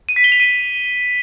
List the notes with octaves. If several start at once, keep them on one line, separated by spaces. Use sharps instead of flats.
D#7
B6
G7
F7
D#7